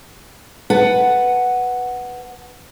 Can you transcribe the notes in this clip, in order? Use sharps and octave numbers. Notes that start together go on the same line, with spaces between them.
B4 F#5 A5